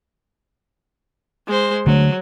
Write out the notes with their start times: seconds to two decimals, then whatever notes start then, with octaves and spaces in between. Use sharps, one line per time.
1.47 G#3 C5
1.87 D3 F#3 A3